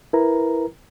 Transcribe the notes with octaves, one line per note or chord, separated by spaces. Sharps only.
E4 A#4 B4 A#5